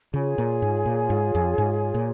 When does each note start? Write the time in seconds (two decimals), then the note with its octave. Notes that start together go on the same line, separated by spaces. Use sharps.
0.13 C#3 F4 G#4 C#5 G#5
0.38 A#2
0.62 G#2
0.86 A#2
1.10 G#2
1.35 F2
1.58 G#2
1.94 A#2